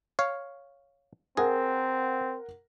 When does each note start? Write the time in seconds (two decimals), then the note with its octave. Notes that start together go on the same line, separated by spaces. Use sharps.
0.19 C#5 F5
1.37 C4 G#4 A#4 F#5